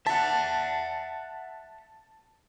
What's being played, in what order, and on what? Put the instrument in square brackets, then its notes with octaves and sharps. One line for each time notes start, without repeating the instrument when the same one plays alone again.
[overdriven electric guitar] E5 F#5 [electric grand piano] A5